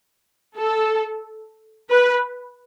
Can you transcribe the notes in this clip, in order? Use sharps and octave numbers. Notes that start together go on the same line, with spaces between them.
A4
B4